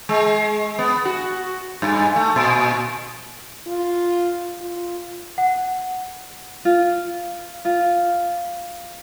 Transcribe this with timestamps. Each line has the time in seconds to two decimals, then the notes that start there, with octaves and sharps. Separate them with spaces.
0.09 G#3
0.79 B3
1.05 F#4
1.82 G2
2.16 A3
2.36 A#2
3.67 F4
4.61 F4
5.38 F#5
6.65 F4
7.65 F4